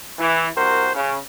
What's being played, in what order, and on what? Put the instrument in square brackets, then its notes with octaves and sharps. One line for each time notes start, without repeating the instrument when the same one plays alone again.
[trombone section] E3
C2 F#4 A#4 C5
C#3